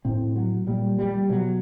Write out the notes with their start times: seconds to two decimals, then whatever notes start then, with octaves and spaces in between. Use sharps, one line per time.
0.05 A2 C4
0.36 F#3
0.67 A#2 G3
0.99 G3
1.29 B2 F#3